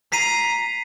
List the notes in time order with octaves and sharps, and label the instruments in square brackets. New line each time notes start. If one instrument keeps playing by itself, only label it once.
[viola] A#5 [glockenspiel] B6 C7 D#7